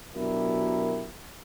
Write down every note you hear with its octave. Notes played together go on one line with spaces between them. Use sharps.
B2 F#3 D4 E4 G4 A#4